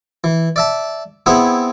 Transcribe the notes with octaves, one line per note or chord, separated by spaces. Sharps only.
E3
D5 E5 A5
B3 C4 E4 G#4 B4